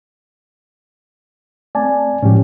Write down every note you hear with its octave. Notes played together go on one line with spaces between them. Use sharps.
A3 C4 D5 G#5 A5
A2 F3 G#3 C#4 G4